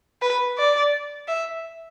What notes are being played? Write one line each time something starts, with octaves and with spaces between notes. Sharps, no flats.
B4
D5
E5